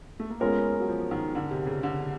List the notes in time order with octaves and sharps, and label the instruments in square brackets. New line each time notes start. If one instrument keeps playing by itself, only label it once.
[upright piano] A3
A#3
[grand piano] G#3 C#4 F4 A#4 [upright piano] B3
[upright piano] F#3
F3
D#3
D3
C3
C#3
D3